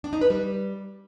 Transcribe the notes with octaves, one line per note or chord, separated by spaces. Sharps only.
D4
D#4
B4
G3